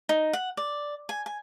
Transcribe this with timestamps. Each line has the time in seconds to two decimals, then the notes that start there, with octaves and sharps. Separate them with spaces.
0.09 D#4
0.33 F#5
0.57 D5
1.09 G#5
1.26 G#5